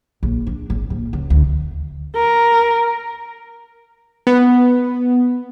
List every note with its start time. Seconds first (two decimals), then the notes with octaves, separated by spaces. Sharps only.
0.23 A#1
0.47 D4
0.70 G#1
0.90 A#1
1.13 C#2
1.30 D2
2.16 A#4
4.27 B3